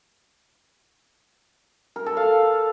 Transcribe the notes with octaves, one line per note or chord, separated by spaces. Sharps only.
A#4
A4
F5